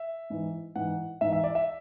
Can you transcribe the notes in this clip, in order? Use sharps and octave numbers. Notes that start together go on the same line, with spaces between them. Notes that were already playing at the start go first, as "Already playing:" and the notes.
Already playing: E5
G#2 E3
G#2 E3 F#5
G#2 E3 E5
E5
D5
E5